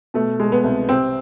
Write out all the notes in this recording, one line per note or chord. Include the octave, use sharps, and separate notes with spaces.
B2 A3
G#3
B3
C2
C3 C4